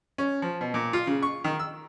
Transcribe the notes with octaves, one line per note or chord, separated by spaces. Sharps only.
C#4
F3
B2
A#2
F4
C#3
C#6
D#3
E6